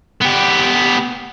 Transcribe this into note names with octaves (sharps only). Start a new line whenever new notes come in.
B3 G4